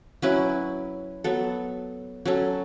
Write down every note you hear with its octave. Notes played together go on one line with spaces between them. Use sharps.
F#3 C#4 E4 B4
F#3 B3 A4
F#3 C#4 A4